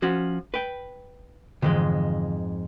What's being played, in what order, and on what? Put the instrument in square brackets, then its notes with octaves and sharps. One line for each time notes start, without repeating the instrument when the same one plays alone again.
[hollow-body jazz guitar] F3 C#4 F#4
B4 G5
[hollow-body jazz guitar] F2 G#2 G#3 [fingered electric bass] D3 E3